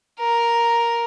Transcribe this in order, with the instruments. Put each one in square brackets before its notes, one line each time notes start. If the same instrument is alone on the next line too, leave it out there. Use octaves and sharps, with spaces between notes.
[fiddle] A#4